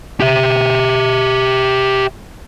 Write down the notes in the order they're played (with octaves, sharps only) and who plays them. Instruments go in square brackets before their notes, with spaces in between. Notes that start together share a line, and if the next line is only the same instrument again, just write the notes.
[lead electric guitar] G4 E5